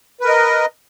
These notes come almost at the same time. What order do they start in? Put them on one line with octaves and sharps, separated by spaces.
B4 A#4 D#5